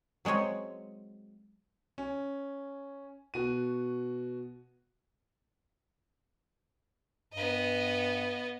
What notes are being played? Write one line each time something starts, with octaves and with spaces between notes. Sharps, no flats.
F#3 G#3 C4 C#5 D#5
C#4
B2 F#4 D#7
G2 B3 D#5